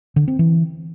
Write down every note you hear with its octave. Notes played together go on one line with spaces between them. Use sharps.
D3
C4
E3